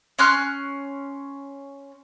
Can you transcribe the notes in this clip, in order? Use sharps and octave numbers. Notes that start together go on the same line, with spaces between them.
C#4 C6 F6 F#6